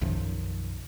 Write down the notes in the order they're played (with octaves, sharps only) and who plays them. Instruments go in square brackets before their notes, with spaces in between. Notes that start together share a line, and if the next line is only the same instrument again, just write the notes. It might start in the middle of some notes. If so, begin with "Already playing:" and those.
[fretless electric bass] B1 F#2 D#3 F3